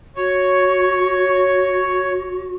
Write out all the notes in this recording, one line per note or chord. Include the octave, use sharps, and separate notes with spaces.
F#4 C#5